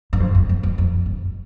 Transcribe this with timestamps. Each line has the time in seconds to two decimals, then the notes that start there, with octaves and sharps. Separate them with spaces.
0.13 G2
0.20 F2
0.35 F2
0.49 E2
0.63 F2
0.78 F2
1.06 G2